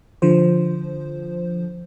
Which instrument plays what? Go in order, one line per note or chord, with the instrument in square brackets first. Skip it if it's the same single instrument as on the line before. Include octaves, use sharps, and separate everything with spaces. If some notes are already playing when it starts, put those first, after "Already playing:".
[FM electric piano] D3 F3 C5